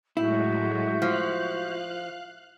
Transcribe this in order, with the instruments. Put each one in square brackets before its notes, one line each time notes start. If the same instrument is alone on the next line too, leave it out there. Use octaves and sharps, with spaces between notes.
[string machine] A2 F#3 G#3 [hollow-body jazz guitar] E4 [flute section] F#4 E5 G6
[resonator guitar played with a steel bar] F3 [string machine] F5 F#6